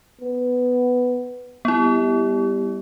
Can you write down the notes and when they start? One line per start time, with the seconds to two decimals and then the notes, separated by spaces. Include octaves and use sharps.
0.21 B3
1.65 G3 B3 E4